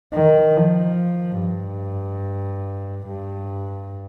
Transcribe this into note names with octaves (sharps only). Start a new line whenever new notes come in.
D#3
F3
G2
G2